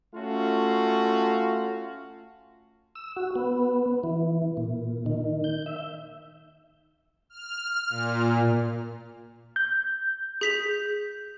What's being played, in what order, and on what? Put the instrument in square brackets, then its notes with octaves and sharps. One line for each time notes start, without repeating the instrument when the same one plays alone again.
[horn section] A3 C#4 F4 F#4 F5
[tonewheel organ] E6
F#4
B3
E3
A#2
D#3
G6
E5
[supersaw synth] F6
A#2
[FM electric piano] G6
[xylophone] G#4 B6 F7